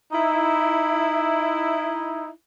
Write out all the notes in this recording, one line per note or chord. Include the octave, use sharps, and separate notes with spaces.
D#4 E4